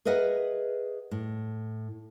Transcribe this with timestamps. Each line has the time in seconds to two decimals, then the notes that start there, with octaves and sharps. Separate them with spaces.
0.05 G#4 A#4 B4 D#5 E5 F#5
1.11 A2